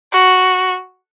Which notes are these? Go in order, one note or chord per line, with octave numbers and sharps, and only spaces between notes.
F#4